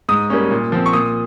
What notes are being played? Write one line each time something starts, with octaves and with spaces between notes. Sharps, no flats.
G#2 D#6
G3 A#3 C#4
A#2
F3 C4
C#6
A#2 D#6